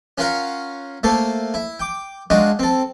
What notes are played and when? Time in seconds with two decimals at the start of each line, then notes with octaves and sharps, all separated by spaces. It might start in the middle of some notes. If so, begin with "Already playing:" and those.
0.18 C#4 F4 A#4 F5 F#5 A#5
1.03 A3 A#3 A4 C5
1.54 E4
1.80 G5 D6
2.30 G#3 D4 D#4 F4 F#4
2.59 C4 A4